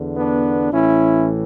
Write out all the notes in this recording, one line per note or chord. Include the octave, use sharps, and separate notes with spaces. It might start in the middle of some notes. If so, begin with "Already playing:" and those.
Already playing: E2 D3
B3 D4
A1 A2 E3 C#4 E4